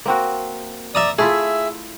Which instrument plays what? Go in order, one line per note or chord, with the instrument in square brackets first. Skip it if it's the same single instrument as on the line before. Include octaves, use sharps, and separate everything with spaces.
[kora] A#3 C4 F#4
[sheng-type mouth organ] D5 [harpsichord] E5 A#5 D#6
[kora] A3 E4 F4 [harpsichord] G#4 [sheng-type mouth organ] E5